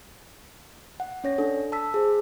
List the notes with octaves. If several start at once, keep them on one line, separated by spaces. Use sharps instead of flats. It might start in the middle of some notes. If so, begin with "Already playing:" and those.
F#5
C#4 C#5 A#6
D4 A4
A5 E6 B6
G#4 C5